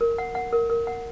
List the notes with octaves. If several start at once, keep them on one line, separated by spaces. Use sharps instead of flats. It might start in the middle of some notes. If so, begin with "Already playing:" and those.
A#4
F#5
F#5
A#4
A#4
F#5